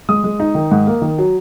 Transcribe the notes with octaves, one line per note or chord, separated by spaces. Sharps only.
G#3 D#6
G#3
D#4
D#3
G#2
A#3
D#3
F#3